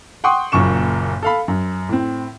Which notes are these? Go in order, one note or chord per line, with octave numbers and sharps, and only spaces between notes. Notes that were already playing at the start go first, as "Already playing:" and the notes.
F#5 G5 C6 C#6 D#6
F#1 F#2 A#2 C#6 E7
A4 F5 B5
F#2
A2 C4